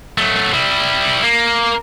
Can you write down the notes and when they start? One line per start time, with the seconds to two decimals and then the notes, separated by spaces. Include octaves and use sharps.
0.18 F#3 A3
0.53 G3 E4
1.23 A#3